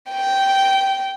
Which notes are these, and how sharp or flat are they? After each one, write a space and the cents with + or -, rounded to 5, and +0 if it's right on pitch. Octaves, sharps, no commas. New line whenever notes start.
G5 -10